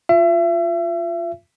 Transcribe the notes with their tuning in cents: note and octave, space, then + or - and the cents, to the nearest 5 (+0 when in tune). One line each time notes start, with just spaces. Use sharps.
F4 +0 E5 +35